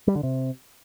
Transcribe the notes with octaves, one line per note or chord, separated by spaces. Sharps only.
G3
D3
C3